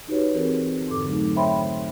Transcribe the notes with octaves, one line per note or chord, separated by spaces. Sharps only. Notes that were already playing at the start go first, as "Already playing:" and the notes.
D#4 F#4 G4 B4 C#5
E3 C4 G#4 A#4
F2 G#2 D3 A4 D6
F#3 A3 D#4
C5 C#5 E5 G5 B5 C6